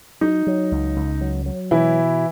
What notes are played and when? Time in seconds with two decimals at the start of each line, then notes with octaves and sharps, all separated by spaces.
0.21 F#3 D#4
0.47 F#3
0.71 C#2
0.96 C#2
1.21 F#3
1.46 F#3
1.71 B2 E3 E4